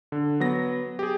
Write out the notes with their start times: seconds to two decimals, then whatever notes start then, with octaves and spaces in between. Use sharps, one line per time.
0.12 D3
0.40 F#3 B3 A#6
0.99 G4 G#4